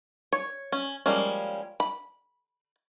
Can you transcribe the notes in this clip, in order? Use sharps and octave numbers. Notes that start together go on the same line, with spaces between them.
C#5
C#4
F3 G3 G#3 A#3 C#4
B5